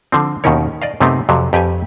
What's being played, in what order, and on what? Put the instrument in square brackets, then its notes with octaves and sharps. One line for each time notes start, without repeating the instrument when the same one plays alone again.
[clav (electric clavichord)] D3 F3 C4
D#2 B2 D#3 C#4 A#4 C#5
D5 D#5 F5
F#2 C3 A3 B3 C4 D#4
F2 C3 F#3
F2 G4 B4 G5 G#5